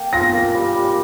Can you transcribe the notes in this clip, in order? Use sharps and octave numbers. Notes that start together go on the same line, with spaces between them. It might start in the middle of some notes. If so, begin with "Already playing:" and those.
Already playing: A#3 G5
F4 A#6
A#3
G3
G3